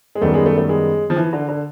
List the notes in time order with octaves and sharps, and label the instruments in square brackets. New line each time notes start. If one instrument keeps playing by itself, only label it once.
[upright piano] G#3
[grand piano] F#2 D#3 G3 B3 [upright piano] A3
[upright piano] G#3
A3
A3
G#3
F3
E3
D3
D3